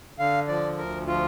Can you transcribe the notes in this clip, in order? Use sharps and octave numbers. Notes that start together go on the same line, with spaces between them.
D3 F5
F3 D5
D2 A#4
F3 F4